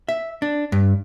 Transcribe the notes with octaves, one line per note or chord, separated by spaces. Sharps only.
E5
D4
G2